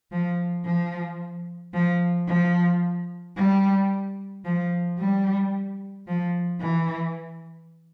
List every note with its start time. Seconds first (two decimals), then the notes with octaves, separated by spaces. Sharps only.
0.12 F3
0.65 F3
1.74 F3
2.27 F3
3.37 G3
4.45 F3
4.99 G3
6.07 F3
6.61 E3